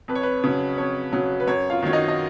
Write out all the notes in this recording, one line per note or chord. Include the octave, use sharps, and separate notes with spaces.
F2 B4
C#5
B4
C#3 F#3
F2 C#5
C#3 F#3
B4
F#2 C#5
F4 F5
D#3 F#3 C#5
D#4 D#5
D#5